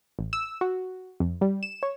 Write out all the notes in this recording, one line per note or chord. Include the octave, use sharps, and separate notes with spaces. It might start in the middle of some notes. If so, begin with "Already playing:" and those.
A1
E6
F#4
F2
G3
E7
C#5